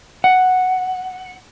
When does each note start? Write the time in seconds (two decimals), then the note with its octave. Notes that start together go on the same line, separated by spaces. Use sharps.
0.24 F#5